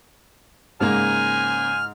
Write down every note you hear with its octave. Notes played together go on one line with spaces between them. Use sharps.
G#2 C#3 A#3 C5 G#5 F6